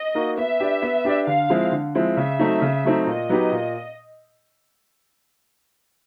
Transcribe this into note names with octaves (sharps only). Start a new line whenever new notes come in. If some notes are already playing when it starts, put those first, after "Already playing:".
Already playing: D#5
A#3 D#4 F#4
B3 E5
D4 G4 B4 D5
B3
D4 G4 B4 D5
D3 F5
F3 G#3 C4 E4
D3
F3 G#3 C4 E4
C#3 E5
F#3 A3 C4 D#4
C#3
F#3 A3 C4 D#4
A#2 D#5
F#3 B3 D#4 G4
A#2